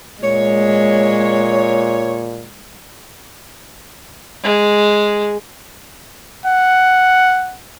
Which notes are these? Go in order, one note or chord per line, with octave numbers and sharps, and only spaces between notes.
A#2 G#3 C#5
G#3
F#5